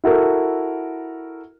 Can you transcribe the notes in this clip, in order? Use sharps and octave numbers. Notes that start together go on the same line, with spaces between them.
E4 F#4 A4 A#4